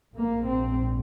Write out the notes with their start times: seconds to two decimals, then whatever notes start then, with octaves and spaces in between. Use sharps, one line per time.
0.15 A#1 G#2 A#3
0.47 C4